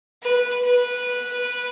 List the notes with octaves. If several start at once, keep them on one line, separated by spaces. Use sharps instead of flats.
B4
B4